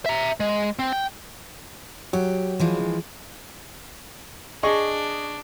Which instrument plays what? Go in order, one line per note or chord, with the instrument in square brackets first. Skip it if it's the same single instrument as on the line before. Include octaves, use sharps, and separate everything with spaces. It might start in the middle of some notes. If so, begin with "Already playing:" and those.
[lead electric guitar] E5 A#5
G#3
C4
G5
[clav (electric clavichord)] F#3 [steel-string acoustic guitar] G4
[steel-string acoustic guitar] E3 F3 G#3
[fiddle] D4 [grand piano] G#4 D#5 C#6